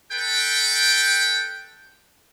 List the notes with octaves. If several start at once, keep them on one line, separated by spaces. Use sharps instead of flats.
A4 B4 G5